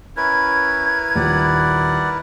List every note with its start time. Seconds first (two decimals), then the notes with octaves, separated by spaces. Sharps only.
0.17 C#4 E4 A#4 B4 G#6
1.15 D#1 D5 F#5